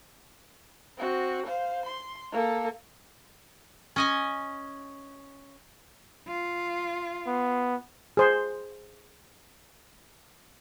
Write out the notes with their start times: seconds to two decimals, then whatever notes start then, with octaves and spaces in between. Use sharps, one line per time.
0.98 C4 F#4
1.47 C5 F5
1.86 C6
2.32 A#3 A4
3.96 C#4 D#5 G#5
6.27 F4
7.27 B3
8.17 G#4 C5 C6